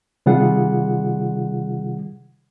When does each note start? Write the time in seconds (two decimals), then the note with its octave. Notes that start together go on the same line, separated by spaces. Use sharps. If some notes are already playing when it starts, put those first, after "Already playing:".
0.26 C3 D#3 G3 F4 G#4 F#5